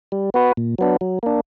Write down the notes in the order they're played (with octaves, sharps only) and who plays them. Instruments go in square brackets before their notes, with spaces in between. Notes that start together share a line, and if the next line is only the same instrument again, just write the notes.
[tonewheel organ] G3
B3 F#4 B4
A#2
F#3 B3 D4
F#3
A#3 D4